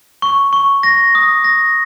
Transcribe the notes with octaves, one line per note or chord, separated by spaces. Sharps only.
C#6
C#6
A#6
D#6
A#6